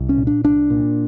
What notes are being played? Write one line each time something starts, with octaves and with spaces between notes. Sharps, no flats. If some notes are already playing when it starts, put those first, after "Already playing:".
Already playing: C2
C#4
A#2
D4
C2 D4
A#2